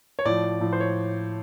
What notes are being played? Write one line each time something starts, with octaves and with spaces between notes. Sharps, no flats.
C#5
A2 F3 D5
A2 F3
C5
C#5